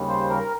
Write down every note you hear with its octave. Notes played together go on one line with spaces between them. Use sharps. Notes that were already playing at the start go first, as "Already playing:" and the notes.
Already playing: D#2 C#3 G3
C5
A#4